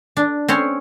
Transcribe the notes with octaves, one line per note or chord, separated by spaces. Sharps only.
D4
C4 C#4 C#5 C6